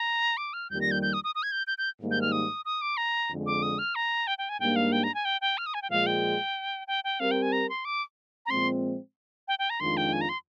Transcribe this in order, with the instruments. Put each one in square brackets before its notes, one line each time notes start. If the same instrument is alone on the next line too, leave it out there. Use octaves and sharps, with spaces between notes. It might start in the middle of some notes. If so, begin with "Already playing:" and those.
Already playing: [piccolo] A#5
D6
F6
[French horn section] F2 D#3 G3 A#3 [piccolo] G6
[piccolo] A#6
G6
G6
D#6
D#6
D#6
G#6
G6
G6
G6
[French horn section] G#2 D#3 G3 A#3
[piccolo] G6
F6
D#6
D#6
D6
A#5
[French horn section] F2 D3 G#3
[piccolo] D6
D#6
F6
A#5
G5
G5
G#5
[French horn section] G#2 G3 A#3 D4 [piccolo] G5
[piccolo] F5
G5
A#5
G#5
G5
G5
F6
D#6
G#5
G5
[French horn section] A#2 F3 G#3 [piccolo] F5
[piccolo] G5
G5
G5
[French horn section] G3 C4 G4 A#4 [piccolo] F5
[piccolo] G5
G#5
A#5
C6
D6
A#5
[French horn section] A#2 F3 G#3 C4 [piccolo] C6
[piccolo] G5
G5
A#5
[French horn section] F2 D#3 G#3 D4 F4 [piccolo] C6
[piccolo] G5
G#5
A#5
C6